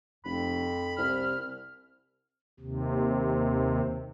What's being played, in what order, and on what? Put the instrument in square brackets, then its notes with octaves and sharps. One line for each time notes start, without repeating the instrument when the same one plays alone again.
[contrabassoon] F1 [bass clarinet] F2 [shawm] B5
[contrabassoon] C2 [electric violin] F6
[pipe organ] D#2 C3